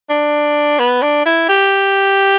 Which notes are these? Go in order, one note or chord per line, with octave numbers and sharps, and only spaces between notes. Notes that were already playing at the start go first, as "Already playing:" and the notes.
D4
B3
D4
E4
G4